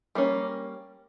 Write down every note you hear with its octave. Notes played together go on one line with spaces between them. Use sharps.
G3 A#3 C#4